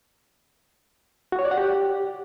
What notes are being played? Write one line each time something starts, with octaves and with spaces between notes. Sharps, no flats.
F#4
C#5
D5
F#5
G4